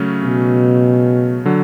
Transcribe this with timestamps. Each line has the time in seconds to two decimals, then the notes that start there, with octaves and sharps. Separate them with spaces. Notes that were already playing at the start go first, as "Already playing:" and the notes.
Already playing: C#3 F#3 A3 C#4
0.23 B2
1.45 D3 F#3